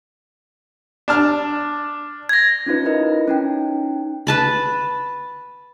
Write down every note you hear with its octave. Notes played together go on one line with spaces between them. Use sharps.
D4 A5 F6
G#6 A#6
C#4 D#4 F4 B4
E4 A#4 B4 D#5
C#4 D#4 G5
B4 A5 B5